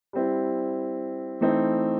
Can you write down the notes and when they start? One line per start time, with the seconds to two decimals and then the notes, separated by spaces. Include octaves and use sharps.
0.13 G3 C4 E4
1.41 E3 A3 C4 D#4